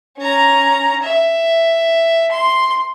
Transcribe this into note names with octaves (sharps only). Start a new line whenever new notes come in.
C#4 A#5
E5
C6